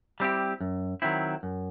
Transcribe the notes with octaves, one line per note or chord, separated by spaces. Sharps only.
G3 C4 E4 G4
F#2
D#3 F#3 C4 E4
F#2